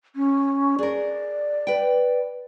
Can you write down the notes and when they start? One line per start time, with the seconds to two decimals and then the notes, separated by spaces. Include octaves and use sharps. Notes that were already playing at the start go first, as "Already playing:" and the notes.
0.16 C#4
0.79 G#4 A#4 D5
1.67 B4 G5